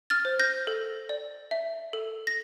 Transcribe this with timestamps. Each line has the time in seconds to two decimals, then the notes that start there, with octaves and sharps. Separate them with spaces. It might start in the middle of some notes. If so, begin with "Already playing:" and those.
0.10 F6 A6
0.25 C5
0.40 G6 A#6
0.67 A4
1.09 D5
1.51 E5
1.93 A4
2.27 A#6